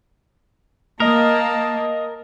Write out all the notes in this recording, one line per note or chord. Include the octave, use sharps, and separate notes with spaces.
A#3 A#4 D#5 A5 D#6